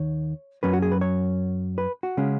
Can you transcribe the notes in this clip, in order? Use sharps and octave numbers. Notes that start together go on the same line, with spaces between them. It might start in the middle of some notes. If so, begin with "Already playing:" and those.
Already playing: D#2 D#3 C#5
F#2 F#3 C#4 B4
F#4
G#4
B4
C#5
B4
F#4
C#3 G#3 C#4